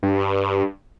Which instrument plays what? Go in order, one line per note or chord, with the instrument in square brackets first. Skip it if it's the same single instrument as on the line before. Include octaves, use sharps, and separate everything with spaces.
[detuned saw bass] G2